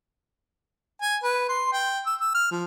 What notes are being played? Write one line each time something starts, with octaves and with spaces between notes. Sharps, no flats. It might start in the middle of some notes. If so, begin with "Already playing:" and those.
G#5
B4
C6
G5
E6
E6
F6
F3